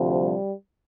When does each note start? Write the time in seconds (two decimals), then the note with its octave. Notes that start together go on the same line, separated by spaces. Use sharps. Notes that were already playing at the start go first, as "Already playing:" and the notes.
Already playing: D2 C3 F3
0.14 G3